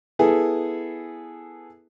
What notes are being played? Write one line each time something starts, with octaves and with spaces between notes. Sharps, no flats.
B3 E4 G#4 A4